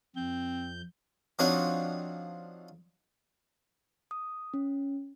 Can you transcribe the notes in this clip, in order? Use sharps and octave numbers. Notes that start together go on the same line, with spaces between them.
F2 C4 G6
F3 C4 D4 D#4 F#4 C#5
D#6
C#4